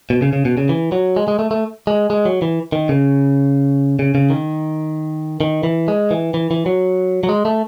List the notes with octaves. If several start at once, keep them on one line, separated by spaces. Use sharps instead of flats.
B2
C#3
C#3
B2
C#3
E3
F#3
G#3
G#3
A3
A3
G#3
G#3
F#3
E3
D#3
C#3
C#3
C#3
D#3
D#3
E3
G#3
E3
E3
E3
F#3
F#3
G#3
A3